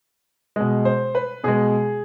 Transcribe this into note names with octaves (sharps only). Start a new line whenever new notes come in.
B2 G#3 D#5
C5
B4
B2 G#3 G#4